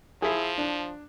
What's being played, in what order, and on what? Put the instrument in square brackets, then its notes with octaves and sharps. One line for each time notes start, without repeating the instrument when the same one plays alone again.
[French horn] F3 [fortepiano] E4 G#4
[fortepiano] D4